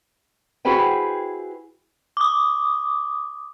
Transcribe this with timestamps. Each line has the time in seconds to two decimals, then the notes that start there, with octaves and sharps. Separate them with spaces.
0.65 E4 F#4 G#4 B4 C5 G5
2.17 D6 D#6